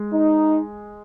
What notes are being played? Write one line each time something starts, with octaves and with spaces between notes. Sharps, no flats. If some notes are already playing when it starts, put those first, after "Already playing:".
Already playing: G#3
D#4